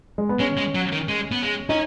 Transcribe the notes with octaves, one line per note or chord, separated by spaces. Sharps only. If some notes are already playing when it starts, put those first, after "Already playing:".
G#3
B3
G#3 C#4
G#3
F#3
D#3
G#3
B3
G#3
C#4 D#4